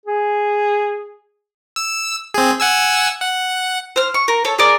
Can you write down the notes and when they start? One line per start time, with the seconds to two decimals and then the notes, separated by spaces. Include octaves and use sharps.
0.06 G#4
1.76 E6
2.34 C4 G#4
2.60 F#5 G#5 E6
3.20 F#5
3.96 C5 F6
4.14 C#6
4.28 A#4
4.45 A4 C#5
4.59 G#4 A#4 D5